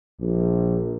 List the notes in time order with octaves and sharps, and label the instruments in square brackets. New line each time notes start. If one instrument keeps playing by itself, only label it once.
[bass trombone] A#1